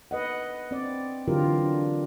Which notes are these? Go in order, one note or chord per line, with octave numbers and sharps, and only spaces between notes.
B4 D#5 F#5
C4 D5
D3 E3 F#3 F4 G4 A#4
D4